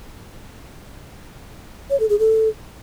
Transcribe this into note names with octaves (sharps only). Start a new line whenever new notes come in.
C#5
A4
G#4
A4